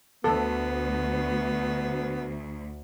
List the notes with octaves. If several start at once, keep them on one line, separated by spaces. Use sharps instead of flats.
D2 B3 A4